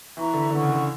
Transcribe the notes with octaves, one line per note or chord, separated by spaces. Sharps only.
E3 B4 E5 A#5 C#6
D3
D3 B4 F#5 C#6
C#3
D3